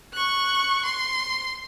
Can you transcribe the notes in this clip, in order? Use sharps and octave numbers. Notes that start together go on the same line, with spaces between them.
C#6 F#6
C6